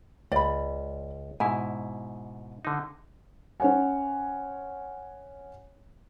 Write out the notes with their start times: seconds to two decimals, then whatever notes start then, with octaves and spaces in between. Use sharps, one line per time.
0.32 C#2 D5 B5
1.40 G#2 B2 E4 G#5
2.65 D3 D#4
3.60 C#4 C5 C#5 F#5 G#5